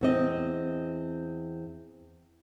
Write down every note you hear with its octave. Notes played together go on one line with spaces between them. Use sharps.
E2 C4 D#5